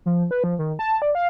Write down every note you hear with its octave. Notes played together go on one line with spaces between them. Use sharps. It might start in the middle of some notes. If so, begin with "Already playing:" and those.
F3
B4
F3
D#3
A5
D5
F5